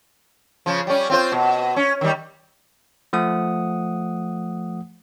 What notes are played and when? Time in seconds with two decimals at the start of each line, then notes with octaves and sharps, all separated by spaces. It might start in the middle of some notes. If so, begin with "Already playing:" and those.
0.66 C#3 F3
0.87 G3 C#4
1.10 C4 F4 C5
1.32 B2
1.76 C#4
2.01 D#3 G3
3.13 F3 A3 F#5 D#6